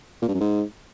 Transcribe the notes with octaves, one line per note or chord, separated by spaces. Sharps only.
A#2
G2
F#2
G#2